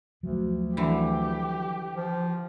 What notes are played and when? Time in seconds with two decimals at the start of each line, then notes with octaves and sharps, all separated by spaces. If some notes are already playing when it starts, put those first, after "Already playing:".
0.23 D2 F3 F#3
0.77 D3 E3 G4
1.96 F3